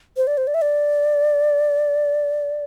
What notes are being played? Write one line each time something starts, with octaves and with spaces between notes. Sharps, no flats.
C5
D5
C5
D5
E5
D5